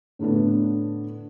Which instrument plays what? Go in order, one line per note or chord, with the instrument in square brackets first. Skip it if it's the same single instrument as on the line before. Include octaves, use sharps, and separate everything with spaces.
[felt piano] A2 D3 A3 B3 D4